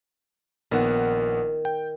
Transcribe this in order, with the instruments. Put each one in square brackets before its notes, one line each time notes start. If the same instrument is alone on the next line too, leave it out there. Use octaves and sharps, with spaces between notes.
[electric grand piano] A#1 B3 F#5 [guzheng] D#3
[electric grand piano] G5